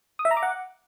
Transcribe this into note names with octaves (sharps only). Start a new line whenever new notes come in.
D#6
E5
A#5
D6
F#5